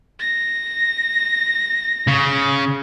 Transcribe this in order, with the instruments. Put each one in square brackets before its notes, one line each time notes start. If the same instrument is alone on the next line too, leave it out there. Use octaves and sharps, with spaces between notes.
[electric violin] A#6
[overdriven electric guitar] C#3